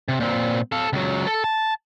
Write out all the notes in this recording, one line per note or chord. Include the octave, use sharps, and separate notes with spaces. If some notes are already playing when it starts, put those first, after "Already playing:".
C3
A#2 C4
A4 F5
C#2 F#3
A4
A5